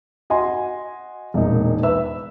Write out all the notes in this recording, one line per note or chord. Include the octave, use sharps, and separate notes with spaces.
F#4 D#5 G#5 C6
E1 A#2 D#4
B4 E5 E6